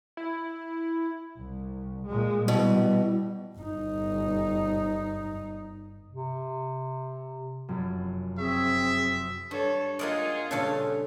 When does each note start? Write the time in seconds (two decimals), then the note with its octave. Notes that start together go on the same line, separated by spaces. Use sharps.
0.17 E4
1.38 C2
2.06 A#2 G#3
2.48 B2 E3 G3
3.58 G1 D#4
6.12 C3
7.68 F1 F#2
8.38 C4 G#4 E5 C#6 C7
9.51 G2 A4 C#5
9.99 G#3 A#3 D#4 F4 G#4 D5 F#5
10.51 G2 A#2 C#3 A4 F5